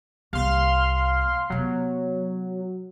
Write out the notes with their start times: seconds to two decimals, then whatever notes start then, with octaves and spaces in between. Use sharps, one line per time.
0.33 C2 A#3 F5 C6 F6
1.50 C3 F#3 B3